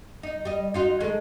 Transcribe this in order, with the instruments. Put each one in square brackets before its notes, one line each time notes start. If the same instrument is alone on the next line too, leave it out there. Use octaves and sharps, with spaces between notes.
[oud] D#4
G3 D#5
D#4 F4 F#4
D#3 G#3 A3